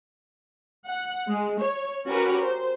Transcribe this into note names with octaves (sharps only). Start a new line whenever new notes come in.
F#5
G#3
C#5
C#4 F#4 G4 A#4 B4
C5